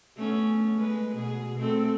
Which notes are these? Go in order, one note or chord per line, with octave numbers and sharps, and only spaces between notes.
A3 B3 C#4
G#3 B4
B2 G#4
A3 C4 A4